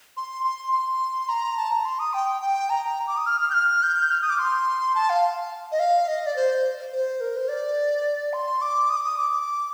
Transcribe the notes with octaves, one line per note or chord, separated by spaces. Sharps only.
C6
C6
C6
A#5
A5
A#5
C6
D#6
G5
G5
A#5
D6
D#6
F6
F6
G6
F6
G6
F6
D#6
D6
C6
A5
F5
D#5
F5
D#5
D5
C5
C5
A#4
C5
D5
C6
D6
D#6
D6
D#6
D6